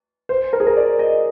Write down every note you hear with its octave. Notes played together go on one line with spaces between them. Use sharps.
C5
A#4
G#4
A#4
D5
D#5